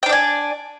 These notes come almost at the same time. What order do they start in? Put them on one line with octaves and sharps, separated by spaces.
G5 D4 D5 G#5